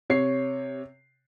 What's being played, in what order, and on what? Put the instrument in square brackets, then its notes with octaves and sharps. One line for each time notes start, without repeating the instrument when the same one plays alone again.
[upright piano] C3 C#5 C7